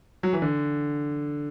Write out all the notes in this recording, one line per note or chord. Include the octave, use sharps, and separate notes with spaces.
F#3
E3
D3